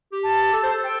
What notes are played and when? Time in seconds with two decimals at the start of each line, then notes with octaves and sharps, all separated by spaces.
0.12 G4
0.23 A5
0.53 A4
0.63 C5
0.73 A4
0.83 G5